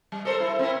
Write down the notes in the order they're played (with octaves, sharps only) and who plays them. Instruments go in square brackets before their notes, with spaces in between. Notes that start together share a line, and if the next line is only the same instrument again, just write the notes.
[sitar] G3
A4 A#4 C5
E4
C4 E4 A#4